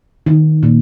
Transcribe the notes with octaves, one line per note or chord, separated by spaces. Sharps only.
D#3
A#2